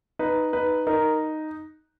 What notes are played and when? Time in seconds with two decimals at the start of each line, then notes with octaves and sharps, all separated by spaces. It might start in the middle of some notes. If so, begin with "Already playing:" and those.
0.19 D#4 B4
0.53 D#4 B4
0.87 D#4 A#4